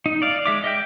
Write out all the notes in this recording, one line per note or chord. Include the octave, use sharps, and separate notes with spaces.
D#4
D5 F5
G#3 E5 D6
D#5 E5 G5